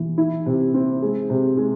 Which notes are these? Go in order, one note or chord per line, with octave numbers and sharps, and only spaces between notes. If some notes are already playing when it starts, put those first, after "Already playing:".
Already playing: E3
E4
C3
C4
G#3
C3
G#3